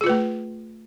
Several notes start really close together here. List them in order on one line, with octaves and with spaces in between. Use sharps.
G#4 F4 B4 A3